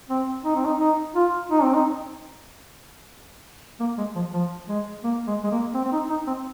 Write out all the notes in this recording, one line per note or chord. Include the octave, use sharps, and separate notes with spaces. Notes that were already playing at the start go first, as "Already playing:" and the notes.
C4
D#4
C4
D#4
D#4
F4
D#4
C4
D#4
A#3
G#3
F3
F3
G#3
A#3
G#3
G#3
A#3
C4
C4
D#4
D#4
C4